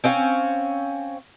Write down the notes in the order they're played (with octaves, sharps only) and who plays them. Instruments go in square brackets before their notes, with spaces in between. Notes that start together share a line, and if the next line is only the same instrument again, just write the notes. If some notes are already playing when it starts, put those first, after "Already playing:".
[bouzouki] C4 C#4 F5